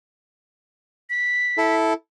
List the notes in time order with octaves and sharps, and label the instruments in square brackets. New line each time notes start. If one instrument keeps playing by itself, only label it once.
[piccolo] B6
[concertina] E4 A4